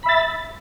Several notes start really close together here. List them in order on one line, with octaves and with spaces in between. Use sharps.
B5 E5 A6